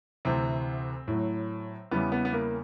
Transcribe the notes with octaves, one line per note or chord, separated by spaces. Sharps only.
D2 C3 E3 C4
A2 F#3
E2 C#3 E3 G3 B3
B3
B3
A#3